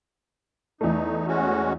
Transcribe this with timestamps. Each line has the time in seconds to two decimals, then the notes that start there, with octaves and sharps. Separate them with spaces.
0.81 E2 A3 D#4
1.27 G#3 C#4 F#4